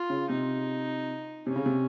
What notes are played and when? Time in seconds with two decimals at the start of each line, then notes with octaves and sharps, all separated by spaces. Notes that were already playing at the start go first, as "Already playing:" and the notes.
Already playing: F4
0.10 C#3
0.30 C3 D#4
1.47 C3 C#4
1.56 C#3
1.66 C3